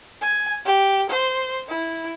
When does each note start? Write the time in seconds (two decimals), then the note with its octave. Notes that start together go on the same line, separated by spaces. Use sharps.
0.21 G#5
0.65 G4
1.10 C5
1.68 E4